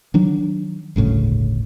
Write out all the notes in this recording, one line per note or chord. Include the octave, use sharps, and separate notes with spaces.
D#3 F#3 D4
G1 D2 A2 C#3